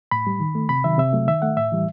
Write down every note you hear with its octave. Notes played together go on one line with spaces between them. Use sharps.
A2 B5
G3
D#3
A3
C3 B5
D#3 F#3 E5
C3 E5
F#3 A3
D#3 E5
A3 F#5
A2 E5
E3 G3